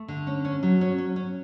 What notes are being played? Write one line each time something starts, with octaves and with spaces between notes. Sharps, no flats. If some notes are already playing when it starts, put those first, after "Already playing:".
Already playing: A3
D3
C#4
C#4
F#3
C#4
C#4
C#4